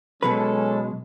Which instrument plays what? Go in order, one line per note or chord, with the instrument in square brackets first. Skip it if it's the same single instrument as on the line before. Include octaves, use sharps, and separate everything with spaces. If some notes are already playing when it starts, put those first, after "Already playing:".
[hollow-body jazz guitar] B2 F#3 B4 [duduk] G#3 [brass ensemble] C#4 A4